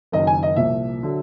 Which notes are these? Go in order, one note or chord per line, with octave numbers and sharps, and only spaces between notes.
F#1 F#2 D#3 D#5
G#5
D#5
C2 A#2 F3 E5
D3 F#3